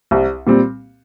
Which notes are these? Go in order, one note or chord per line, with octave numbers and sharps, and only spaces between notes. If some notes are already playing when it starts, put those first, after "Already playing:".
C2
A#2 G3 C4